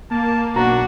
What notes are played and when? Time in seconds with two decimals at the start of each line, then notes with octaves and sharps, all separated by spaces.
0.11 A#3 A5
0.56 B1 D4 F#4 A#5